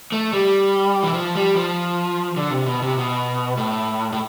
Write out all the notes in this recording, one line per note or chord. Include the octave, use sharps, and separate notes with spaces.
A3
G3
E3
F3
G3
F3
D3
C3
B2
C3
B2
A2
A2